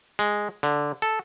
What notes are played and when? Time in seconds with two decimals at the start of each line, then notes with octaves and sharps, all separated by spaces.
0.19 G#3
0.63 D3
1.02 A4